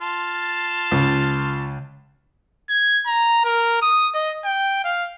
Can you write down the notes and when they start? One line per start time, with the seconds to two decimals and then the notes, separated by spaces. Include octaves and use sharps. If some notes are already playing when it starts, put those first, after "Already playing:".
0.02 F4 A5
0.92 C#2
2.69 G#6
3.06 A#5
3.45 A#4
3.82 D#6
4.14 D#5
4.45 G5
4.84 F5